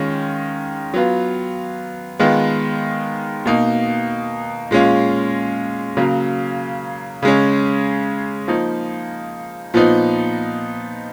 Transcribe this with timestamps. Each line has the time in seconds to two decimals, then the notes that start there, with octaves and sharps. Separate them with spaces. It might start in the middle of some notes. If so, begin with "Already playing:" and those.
Already playing: D#3 G#3 C#4 F4
0.94 F#3 B3 F4
2.19 D#3 G#3 B3 F4
3.45 B2 A#3 D#4
4.71 A#2 G#3 C#4 F4
5.97 C#3 F#3 A#3
7.23 C#3 G#3 C#4
8.48 F3 A#3 D#4
9.74 A#2 F3 B3 D#4